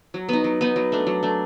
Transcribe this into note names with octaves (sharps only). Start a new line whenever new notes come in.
F#3
B3 D#4
F#3
B3 D#4
F#3
A3 D4
F#3
A3 D4